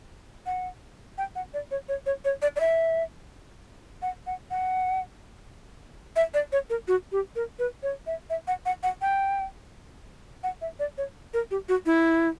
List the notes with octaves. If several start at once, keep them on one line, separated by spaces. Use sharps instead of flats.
F#5
G5
F#5
D5
C#5
C#5
C#5
C#5
D5
D5
E5
F#5
F#5
F#5
E5
D5
C#5
A#4
F#4
G4
A#4
B4
C#5
E5
E5
F#5
F#5
F#5
G5
F#5
E5
D5
C#5
A#4
G4
F#4
E4